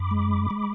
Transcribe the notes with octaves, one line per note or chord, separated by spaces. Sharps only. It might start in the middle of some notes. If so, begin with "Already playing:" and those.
Already playing: F#2 B5 D6
G#3
G#3